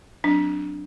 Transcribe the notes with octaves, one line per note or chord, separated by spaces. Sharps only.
F#3 C4 D4